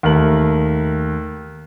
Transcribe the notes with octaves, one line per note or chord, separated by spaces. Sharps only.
D#2 A3 A#4 F#7